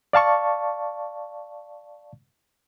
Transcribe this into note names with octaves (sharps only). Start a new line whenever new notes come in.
D5 F5 A5 C#6